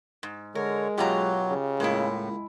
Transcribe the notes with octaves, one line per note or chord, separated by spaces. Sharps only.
G#2
D3 G#3 A#4 C#5
F#2 B2 F#3 F4 G4 D#5 A#5
C#3
C#2 A2 G#3 A#3 E4 D#5